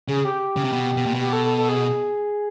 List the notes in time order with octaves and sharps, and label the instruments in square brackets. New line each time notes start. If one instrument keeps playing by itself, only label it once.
[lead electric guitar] C#3 [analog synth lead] G#4
[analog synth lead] G4
[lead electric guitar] C#3
C3
B2
B2
A#2
B2
[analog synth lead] G4
A4
A4
A4
G#4